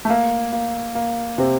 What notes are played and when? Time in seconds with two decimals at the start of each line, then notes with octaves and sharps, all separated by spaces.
0.05 A3
0.10 A#3
0.52 A#3
0.95 A#3
1.38 C3 C4